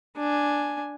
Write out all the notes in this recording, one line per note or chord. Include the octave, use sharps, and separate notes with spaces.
D4 G#5